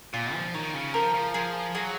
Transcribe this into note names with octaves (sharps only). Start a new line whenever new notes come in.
A#2 F4
F3
D#3 C#5
C#3
F3 A#4
F3
F3 G#4
F#3 G#4